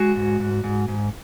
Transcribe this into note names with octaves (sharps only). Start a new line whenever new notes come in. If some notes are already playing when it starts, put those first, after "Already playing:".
Already playing: G#3 F#4
G#2
G#2
G#2
G#2